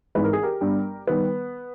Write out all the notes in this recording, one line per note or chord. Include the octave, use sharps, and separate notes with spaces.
G#1 G#2 E3 G#3 B4
A#4
G#4
G4 A#4
G1 G2 G3
D#3 G3 B3